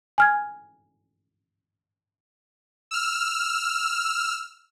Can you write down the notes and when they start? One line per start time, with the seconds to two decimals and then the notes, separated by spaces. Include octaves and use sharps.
0.18 G#5 F6 G#6
2.91 E6 F6